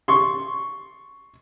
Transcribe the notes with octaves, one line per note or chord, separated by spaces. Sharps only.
C6 C#6